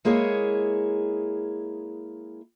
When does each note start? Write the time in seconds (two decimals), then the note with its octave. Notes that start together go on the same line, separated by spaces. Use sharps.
0.05 G#3 A#3 E4 G#4 C#5